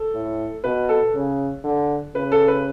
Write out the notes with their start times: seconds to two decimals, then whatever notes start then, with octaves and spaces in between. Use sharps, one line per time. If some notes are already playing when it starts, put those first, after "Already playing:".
Already playing: A4
0.13 A2
0.64 B2 B4
0.89 A4
1.14 C#3
1.64 D3
2.14 C#3 B4
2.32 A4
2.48 B4